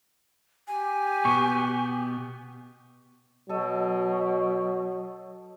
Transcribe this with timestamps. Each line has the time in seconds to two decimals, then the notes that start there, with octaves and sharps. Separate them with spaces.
0.68 G4 G#5
1.25 B2 B3 C#6
3.49 B2 F#3 A4 D#5